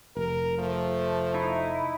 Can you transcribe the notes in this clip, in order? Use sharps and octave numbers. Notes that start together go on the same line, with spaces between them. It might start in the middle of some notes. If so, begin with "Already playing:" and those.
F1 A#4
F3 A3
D#4 E4